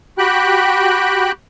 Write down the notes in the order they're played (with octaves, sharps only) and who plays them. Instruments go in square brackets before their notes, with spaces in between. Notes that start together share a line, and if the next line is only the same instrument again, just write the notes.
[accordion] F#4 G4 G5 B5 F#6